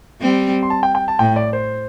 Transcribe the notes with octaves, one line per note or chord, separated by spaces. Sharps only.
G3 C4
C6
A5
G5
G5
A5
A2 G5
D5
C5